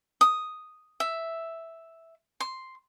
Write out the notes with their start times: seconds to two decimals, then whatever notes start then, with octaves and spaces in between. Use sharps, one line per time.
0.21 D#6
1.00 E5
2.40 C6